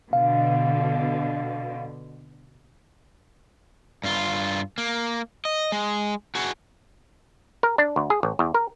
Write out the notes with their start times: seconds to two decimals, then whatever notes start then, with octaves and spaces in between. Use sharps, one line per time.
0.13 B2 D3 F5
4.04 G2 F4
4.78 A#3
5.45 D#5
5.72 G#3
6.35 F#4 G#4
7.63 A#4
7.78 D4
7.96 D2
8.10 G#4
8.23 A1
8.39 E2
8.54 A#4